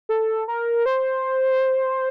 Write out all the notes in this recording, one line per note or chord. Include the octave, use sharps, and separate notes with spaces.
A4
A#4
C5